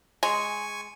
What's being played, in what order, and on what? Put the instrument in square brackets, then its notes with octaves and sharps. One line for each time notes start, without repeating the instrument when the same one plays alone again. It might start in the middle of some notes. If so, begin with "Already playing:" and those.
[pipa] G#3 [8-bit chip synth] G#5 C#6